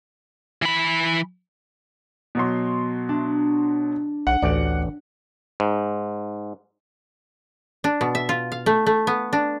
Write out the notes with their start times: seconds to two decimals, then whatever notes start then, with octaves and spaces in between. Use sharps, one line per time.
0.62 E3 B5
2.35 B2 F#3 C6
3.09 D4
4.27 B1 F#5
4.42 A1 D2 D5
5.60 G#2
7.84 D4
8.01 B2
8.15 E5
8.29 F4
8.52 F5
8.66 A3
8.86 A3
9.07 B3
9.33 D4